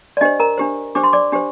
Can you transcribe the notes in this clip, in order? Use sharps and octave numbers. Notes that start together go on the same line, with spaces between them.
D5
D4 G4 C5 D#5
A#4 A#5
D4 G4 C5
D4 G4 C5 D6
C6
D5 D6
D4 G4 C5